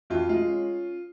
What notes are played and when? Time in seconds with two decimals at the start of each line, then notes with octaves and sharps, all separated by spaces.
0.10 F2 F4
0.29 G#3 F4
0.48 C#4